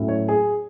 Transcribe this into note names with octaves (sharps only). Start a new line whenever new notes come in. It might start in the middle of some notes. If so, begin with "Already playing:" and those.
Already playing: A2 F#3 A3 C#4 E4
C#5
G#4